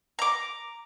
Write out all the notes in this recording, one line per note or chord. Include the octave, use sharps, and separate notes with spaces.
A#5 D6